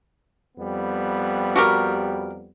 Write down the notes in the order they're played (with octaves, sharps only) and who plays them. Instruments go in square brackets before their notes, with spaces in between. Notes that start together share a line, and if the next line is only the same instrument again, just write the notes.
[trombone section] F2 G3 B3
[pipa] F#4 G4 A#4